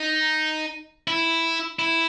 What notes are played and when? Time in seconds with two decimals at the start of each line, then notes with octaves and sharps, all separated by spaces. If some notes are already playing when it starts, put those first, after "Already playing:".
Already playing: D#4
1.08 E4
1.79 E4